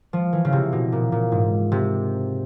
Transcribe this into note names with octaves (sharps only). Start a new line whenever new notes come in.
F3
E3
C#3
C3
B2
A#2
A#2
G#2
C3